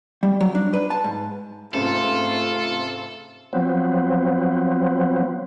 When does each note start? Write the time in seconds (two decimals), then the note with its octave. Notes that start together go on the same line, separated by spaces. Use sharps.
0.23 G3
0.41 F#3
0.55 D4
0.73 B4
0.90 A5
1.04 G#2
1.74 C#2 G#2 C3 A3 F4 A4
3.53 F3 F#3 B3 C4